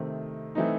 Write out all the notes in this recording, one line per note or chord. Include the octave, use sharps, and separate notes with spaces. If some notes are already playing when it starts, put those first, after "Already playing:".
Already playing: C3 D#3 A3 C4
E3 A3 C4 D#4